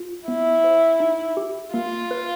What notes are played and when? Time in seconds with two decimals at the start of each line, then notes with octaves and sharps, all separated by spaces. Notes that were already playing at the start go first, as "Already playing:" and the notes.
Already playing: F4
0.28 B3 E4
0.64 C5
1.00 D#4
1.37 G4
1.73 A#3 F4
2.11 B4